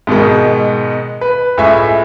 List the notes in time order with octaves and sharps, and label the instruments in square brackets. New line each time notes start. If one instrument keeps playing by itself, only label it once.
[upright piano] G#2 B2 D#3 G#3
B4
C#2 A2 E5 G#5 C#6